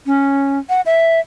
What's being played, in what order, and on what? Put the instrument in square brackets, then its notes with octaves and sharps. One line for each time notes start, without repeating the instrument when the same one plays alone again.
[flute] C#4
F#5
E5